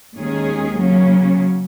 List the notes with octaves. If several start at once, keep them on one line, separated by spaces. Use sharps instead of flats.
D#2 D#3 G#3 C#4 G#4
C#3 F#3 A#3 C#4